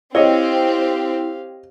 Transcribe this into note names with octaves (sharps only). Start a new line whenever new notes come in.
C4 E4 G4 C#5 D#5 F5